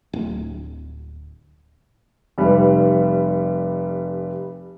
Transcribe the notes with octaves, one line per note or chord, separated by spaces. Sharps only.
D1
F1 G3 B4